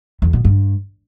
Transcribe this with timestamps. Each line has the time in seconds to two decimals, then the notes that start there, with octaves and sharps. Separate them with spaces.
0.22 E2
0.33 B2
0.45 G2